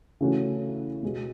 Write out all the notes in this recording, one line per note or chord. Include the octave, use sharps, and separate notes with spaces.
C#3 E3 A3 C#4 F#4
B2 G#3 B3 F#4